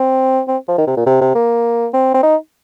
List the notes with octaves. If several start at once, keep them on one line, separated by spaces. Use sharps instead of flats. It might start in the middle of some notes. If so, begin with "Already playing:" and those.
Already playing: C4
C4
F3
D#3
C3
A#2
C3
C3
A#3
C4
C4
D#4